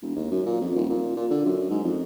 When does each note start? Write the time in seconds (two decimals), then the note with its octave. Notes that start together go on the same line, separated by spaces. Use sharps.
0.02 E1
0.15 D#2
0.31 F#2
0.46 A#2
0.61 F2
0.76 D#1
0.90 A#2
1.17 A#2
1.31 D3
1.45 F#2
1.70 G#2
1.84 F2